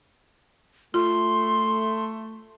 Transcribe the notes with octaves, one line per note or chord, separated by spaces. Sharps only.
A3 F4 C6